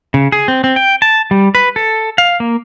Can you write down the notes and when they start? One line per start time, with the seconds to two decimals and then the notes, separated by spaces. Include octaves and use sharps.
0.14 C#3
0.32 G#4
0.48 C4
0.64 C4
0.76 G5
1.02 A5
1.31 G3
1.55 B4
1.76 A4
2.18 F5
2.40 A#3